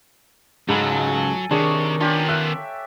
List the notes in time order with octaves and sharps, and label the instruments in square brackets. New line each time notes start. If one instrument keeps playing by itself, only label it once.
[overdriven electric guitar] C#2 B5 [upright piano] G#2 [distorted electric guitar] F#3 [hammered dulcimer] A4 G#5
[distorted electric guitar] C3 [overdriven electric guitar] D#3 [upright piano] D4 G#4 [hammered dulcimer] C#5 C#6
[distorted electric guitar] B3 C#4 [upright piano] D4 [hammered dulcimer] F4 G4
[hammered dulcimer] E5 [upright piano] F#6